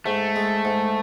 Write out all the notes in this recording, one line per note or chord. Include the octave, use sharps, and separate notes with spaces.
G#2 A3
G#3
G#2